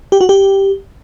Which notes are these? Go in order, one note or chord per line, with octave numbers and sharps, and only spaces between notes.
G4
F#4
G4